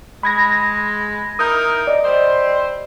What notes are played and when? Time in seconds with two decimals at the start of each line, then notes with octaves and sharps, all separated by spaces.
0.23 G#3 B5 G#6 A#6
1.39 D#4 E4 A#4 D#6 G6
1.87 D5 D#5
2.04 G3 C4 C5